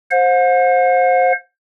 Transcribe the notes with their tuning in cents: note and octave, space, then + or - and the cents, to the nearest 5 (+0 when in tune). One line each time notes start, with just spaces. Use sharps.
C5 +10 F#5 -45